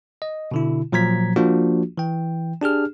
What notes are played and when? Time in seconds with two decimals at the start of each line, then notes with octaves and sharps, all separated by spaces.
0.22 D#5
0.51 B2 D3 E4
0.92 A#2 F3 F#3 A#5 G#6 B6
1.36 F3 A#3 D4 F4 F#4
1.98 E3 G5
2.61 D4 G4 G#4 F6